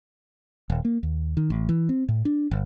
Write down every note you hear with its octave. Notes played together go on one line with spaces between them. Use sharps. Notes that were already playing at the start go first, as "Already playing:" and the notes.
D#1
A#3
D#2
D#3
A1
E3
C4
A2
D4
G1